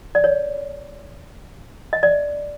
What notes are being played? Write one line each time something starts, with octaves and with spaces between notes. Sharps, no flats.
D5
C#5
D#5
D5